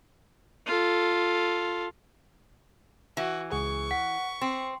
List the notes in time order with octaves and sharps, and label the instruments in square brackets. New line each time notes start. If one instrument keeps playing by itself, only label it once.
[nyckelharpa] F4 A4
[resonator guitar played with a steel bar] E3 [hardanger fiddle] F#4
[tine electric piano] C#2 G#4 [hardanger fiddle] C#6
[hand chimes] F#5 [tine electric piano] B6
[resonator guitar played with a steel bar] C4 [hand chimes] C6